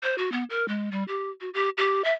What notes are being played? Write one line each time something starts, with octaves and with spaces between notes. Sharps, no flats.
C5
F#4
B3
A#4
G#3
G3
G4
F#4
G4
G4
E5